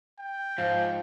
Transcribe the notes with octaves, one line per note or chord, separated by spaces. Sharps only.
G5
G#2 F3 F5 C7